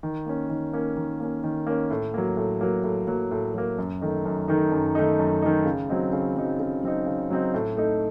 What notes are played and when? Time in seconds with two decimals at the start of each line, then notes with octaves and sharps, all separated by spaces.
0.03 D#3
0.26 A#3 C#4
0.50 D#3
0.73 A#3 C#4
0.97 D#3
1.20 A#3 C#4
1.44 D#3
1.67 A#3 C#4
1.90 A2
2.14 F#3 A#3
2.37 A2
2.61 F#3 A#3
2.84 A2
3.07 F#3 A#3
3.31 A2
3.54 F#3 A#3
3.79 F#2
4.01 D#3 A3 D#4
4.26 F#2
4.48 D#3 A3 D#4
4.72 F#2
4.95 D#3 A3 D#4
5.19 F#2
5.42 D#3 A3 D#4
5.66 C#3
5.89 F#3 C4 D#4
6.12 C#3
6.36 F#3 C4 D#4
6.60 C#3
6.83 F#3 C4 D#4
7.06 C#3
7.31 F#3 C4 D#4
7.54 A2
7.77 A3 D#4